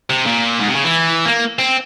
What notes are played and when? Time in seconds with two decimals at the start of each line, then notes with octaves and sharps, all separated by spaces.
0.10 C3
0.26 A#2
0.60 G#2
0.68 C3
0.75 C#3
0.84 E3
1.26 A#3
1.59 C4